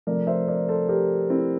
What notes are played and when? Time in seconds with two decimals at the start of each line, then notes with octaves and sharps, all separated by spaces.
0.07 C3 F3 A3 A#4 D5
0.27 C5 E5
0.48 A#4 D5
0.68 A4 C5
0.89 G4 A#4
1.30 C4 E4